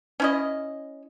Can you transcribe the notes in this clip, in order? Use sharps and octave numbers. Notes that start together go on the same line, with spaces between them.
C#4 E4 D#5